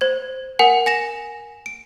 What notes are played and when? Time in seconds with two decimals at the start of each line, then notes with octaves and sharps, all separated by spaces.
0.01 C5 G#6
0.59 A#4 F#5 G#5
0.86 G#5 A#6 E7
1.66 D7